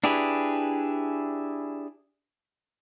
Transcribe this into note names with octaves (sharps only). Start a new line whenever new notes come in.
D4 E4 G4 G#4 B4